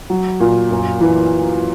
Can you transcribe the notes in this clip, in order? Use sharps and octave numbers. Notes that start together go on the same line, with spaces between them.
F#3
A#2
F#2
E3